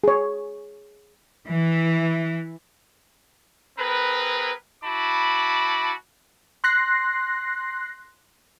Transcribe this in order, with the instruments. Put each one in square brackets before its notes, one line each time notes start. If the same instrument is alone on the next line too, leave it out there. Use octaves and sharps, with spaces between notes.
[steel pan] G#4 C#5
[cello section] E3
[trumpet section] C4 G#4 A#4 B4
E4 F#4 A5 B5 D6
[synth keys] C6 F#6 A#6 C7